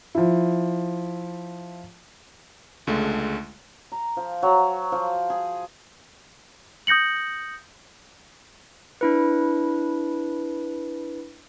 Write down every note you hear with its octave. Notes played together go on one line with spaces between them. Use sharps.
F3 E4
C#2 D3 G#3 A3
A#5
F3
F#3
F3
G#4
D#6 G6 A#6 C#7 F#7
D4 E4 B4